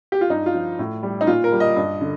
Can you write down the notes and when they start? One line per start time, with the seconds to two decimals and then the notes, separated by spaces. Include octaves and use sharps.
0.12 G4
0.21 F4
0.30 G2 D#4
0.46 F4
0.54 F3
0.79 A2
1.03 G3
1.21 D#4
1.27 A#2 F4
1.44 A#4
1.52 G3
1.60 D#5
1.76 G2
2.01 D3